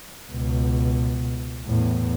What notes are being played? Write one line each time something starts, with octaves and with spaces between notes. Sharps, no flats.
C#2 B2
E2 A2